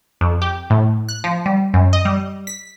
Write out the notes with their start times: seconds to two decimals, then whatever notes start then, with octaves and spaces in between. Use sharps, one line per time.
0.21 F2
0.42 G4
0.70 A2
1.09 F#6
1.24 F3
1.46 G3
1.74 F#2
1.93 D#5
2.05 G3
2.47 B6